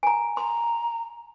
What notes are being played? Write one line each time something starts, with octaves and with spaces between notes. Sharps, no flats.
G#5 A#5
A#5 C6